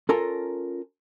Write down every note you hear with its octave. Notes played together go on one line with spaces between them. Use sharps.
C#4 F4 A4 A#4 A#5